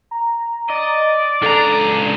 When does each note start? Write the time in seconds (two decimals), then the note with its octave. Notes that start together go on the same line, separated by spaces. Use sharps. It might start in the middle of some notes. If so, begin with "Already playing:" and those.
0.11 A#5
0.69 D5 D#5
1.43 C#2 D4 A4 A#5